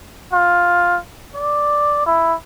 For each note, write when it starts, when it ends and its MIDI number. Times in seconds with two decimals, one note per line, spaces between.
0.32 0.97 65
1.35 2.05 74
2.06 2.35 64